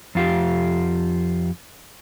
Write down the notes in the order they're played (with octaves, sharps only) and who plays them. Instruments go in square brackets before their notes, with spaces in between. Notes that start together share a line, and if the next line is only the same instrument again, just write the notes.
[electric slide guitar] F2 F4 G4